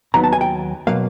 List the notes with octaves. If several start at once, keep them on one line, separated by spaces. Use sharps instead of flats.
D#2 D3 F#3 B3 D#4 A#5
A5
G#5
G5
B2 F#3 A#3 F5